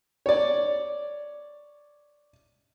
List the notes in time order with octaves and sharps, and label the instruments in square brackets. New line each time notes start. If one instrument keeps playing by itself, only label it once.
[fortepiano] C#5 D5